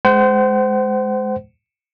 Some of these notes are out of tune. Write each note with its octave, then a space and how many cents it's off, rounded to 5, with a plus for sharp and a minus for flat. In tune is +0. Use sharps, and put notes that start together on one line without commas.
G#3 +15 C5 -20 F#5 +35